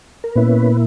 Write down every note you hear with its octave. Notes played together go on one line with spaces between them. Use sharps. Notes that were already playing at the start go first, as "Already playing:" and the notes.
A#4
A#2 A#3 B3 C#4 E4 B4